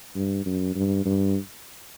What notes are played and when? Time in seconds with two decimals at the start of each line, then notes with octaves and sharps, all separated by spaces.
0.15 G2
0.46 F#2
0.76 G2
1.05 G2